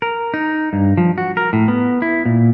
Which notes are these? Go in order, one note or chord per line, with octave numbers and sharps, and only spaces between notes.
A#4
D#4
G2
F3
F#4
A#4
A2
B3
E4
A#2